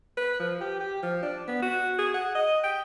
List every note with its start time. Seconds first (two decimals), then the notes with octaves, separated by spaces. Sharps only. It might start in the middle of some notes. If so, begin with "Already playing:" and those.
0.18 B4
0.40 F3
0.61 G4
0.80 G4
1.03 F3
1.23 D4
1.48 B3
1.62 F#4
1.99 G#4
2.14 F#5
2.35 D#5
2.64 G5